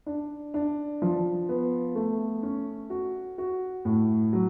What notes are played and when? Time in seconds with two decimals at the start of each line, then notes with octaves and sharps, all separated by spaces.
0.06 D4
0.54 D4
1.02 F3
1.49 B3
1.95 A3
2.43 C#4
2.90 F#4
3.38 F#4
3.85 A2
4.33 F#3